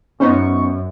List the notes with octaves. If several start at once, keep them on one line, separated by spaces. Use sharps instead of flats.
F#2 B3 C#4 D#4 C5 C#6